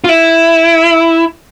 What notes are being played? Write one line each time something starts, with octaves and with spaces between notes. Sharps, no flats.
F4
E4